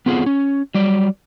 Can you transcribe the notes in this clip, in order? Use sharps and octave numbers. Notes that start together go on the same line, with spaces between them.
B3 C4 F4 G#4 A4 F#5
C#4
F#3 G3 D5